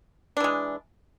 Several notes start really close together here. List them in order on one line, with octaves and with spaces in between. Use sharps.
D4 E3 G#3